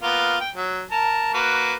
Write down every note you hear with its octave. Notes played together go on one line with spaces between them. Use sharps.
A#3 B3 F4
G5
F#3
A#4 A5
A#3 F#4 B4